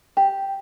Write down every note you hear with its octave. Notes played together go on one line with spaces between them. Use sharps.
G4